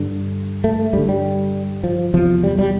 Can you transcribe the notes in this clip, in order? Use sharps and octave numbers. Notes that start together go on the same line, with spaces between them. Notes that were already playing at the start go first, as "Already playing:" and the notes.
Already playing: G2 D3
A3
G2 D3 G3
G3
F3
E2 C3 F3
G3
G3